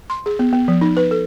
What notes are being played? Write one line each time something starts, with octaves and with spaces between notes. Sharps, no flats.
C6
G#4
B3
B3
F3
D#4
B4
A4